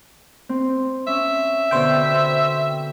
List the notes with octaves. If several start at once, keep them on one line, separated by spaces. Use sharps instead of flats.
C4
C#4 E5
B2 D3 C5 G5